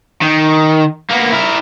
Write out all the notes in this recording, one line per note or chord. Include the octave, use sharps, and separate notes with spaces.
D#3
A#3 B3
E4 A#4